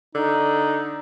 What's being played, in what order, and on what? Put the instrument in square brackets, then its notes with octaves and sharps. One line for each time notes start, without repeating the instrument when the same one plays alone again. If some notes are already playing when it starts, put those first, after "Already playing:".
[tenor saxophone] D3 [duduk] D#4